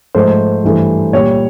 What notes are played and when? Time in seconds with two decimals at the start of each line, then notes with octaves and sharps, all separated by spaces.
0.15 G#2 F3 A3 C5
0.64 G2 E3 A3
1.13 A#2 G3 C#5